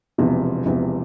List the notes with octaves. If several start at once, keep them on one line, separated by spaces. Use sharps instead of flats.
E1 E2 C3 F3
E1 E2 C3 F3